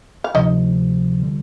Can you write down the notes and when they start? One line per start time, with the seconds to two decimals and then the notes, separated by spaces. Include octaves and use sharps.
0.24 F5
0.35 D2 C3 F3 D#4 D#5
1.22 D3 G3